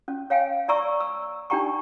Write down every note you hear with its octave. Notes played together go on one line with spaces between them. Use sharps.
C#4
C#5 F5 G5 G#5
D5 E5 A#5 C#6 E6
E6
D4 D#4 G4 G5 A#5 C#6